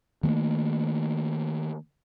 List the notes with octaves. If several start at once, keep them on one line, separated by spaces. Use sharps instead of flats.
D#3 A3 A#3